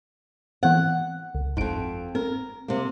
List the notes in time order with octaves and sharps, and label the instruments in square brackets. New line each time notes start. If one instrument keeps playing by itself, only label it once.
[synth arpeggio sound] E3 B3 C4 [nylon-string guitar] F#5
[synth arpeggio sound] C#2
[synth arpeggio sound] G1 D7 [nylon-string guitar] F2 G#2
[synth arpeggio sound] C4 [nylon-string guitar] A#4
[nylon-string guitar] C3 A#3